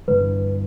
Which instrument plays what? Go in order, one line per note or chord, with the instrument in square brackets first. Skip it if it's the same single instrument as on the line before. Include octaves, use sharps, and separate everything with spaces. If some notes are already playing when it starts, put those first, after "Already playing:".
[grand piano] G1 G2 E3 [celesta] B4